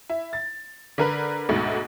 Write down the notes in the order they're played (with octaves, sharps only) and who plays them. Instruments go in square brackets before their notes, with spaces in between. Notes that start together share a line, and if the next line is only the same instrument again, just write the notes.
[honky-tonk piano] E4
A6
D3 A#4 B4
D2 G#2 B2 A3